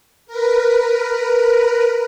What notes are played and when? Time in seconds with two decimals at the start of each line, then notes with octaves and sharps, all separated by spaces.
0.27 A#4 B4